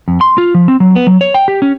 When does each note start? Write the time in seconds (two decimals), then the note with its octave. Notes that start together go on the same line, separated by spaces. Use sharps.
0.08 F2
0.21 C6
0.38 F4
0.55 F3
0.68 C4
0.80 F#3
0.96 B3
1.07 F#3
1.21 C#5
1.35 G5
1.48 G4
1.62 C#4